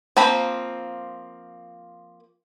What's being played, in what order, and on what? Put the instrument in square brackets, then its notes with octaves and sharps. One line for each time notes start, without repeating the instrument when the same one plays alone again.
[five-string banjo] F3 A#3 C4 B5